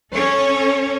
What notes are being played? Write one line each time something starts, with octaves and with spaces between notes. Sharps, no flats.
C#4 A4 C#5